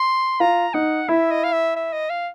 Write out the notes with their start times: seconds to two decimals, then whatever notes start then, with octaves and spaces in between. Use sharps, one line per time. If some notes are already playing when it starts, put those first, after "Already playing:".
Already playing: C6
0.40 F4 A#5
0.74 D#4 F#5
1.08 E4 E5
1.31 D#5
1.44 F5
1.53 E5
1.76 E5
1.93 D#5
2.10 F5